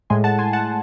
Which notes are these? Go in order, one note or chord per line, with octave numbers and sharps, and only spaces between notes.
A2 G#3 G#5 C6
F#5 A5
G#5 C6
F#5 A5